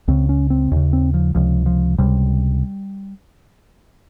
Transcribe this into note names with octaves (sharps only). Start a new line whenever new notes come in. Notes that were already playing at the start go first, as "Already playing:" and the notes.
C#2 C#3 C4
C#4
C4
D#2 C#3
C4
F3
C#2 C3 F3
F3
C#2 C3 G3